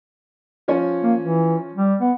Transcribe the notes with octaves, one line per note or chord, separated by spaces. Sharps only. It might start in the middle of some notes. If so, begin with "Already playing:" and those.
F3 C#4 C#5
A#3
E3
G3
B3